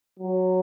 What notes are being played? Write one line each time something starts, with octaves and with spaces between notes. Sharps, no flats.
F#3